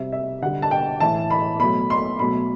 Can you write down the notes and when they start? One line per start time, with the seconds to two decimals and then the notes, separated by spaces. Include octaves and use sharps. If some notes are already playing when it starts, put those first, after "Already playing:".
Already playing: C3 G3 E5
0.12 E5
0.42 D3 G3 F#5
0.62 A5
0.71 G5
1.00 A2 E3 A3 A5
1.30 B5
1.60 B2 F#3 A3 B5
1.90 C6
2.19 B2 F#3 A3 B5